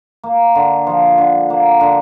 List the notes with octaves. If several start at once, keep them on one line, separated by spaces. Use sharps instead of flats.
A#3
D3
F3
D3
A#3
D3